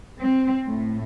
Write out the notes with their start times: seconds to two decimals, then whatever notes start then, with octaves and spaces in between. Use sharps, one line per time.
0.21 C4
0.69 A2